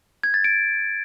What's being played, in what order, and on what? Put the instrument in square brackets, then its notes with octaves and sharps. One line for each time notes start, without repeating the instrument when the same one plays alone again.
[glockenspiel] G#6
A6
D7